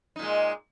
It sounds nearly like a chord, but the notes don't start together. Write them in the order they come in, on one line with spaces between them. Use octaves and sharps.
D#4 A#2 G#3